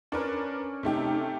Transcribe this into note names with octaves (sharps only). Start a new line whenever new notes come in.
C#4 D4 A#4 B4
C3 A3 D#4 G4